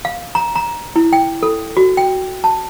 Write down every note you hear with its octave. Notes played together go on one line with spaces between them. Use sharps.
F5
A#5
A#5
E4
G5
A4
F#4
G5
A5